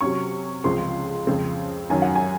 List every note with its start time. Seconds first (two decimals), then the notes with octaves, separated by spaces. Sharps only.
0.01 C3 F#3 C#4 C#6
0.64 C#2 C#3 F3 G#3 C4 C6
1.27 F2 C#3 G#3 C4
1.90 F#2 D#3 F#3 C#4 G#5
2.02 F#5
2.15 G#5